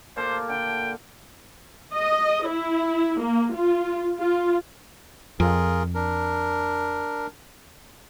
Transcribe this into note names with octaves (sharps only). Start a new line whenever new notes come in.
A#2 A4 C5 D5
D3 G5
D#5
E4
A#3
F4
F4
F2 F4 G#4 A#4
D4 A#4